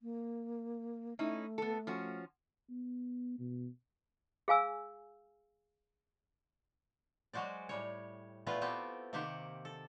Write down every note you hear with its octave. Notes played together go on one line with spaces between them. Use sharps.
A#3
A3 C#4 D#4 E4
B3 A4
F3 C#4 F#4
B3
B2
G#4 F5 G#5 E6
F#3 G#3 F#4 C5 D5
A2 G3 C#5
A#2 A3 B3 E4 F4 B4
A3 B3 C4 G4 C5
C3 D#3 A#3 G4 C5 F#5
A4